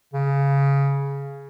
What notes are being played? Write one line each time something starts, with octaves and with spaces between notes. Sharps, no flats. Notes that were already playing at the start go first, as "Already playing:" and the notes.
C#3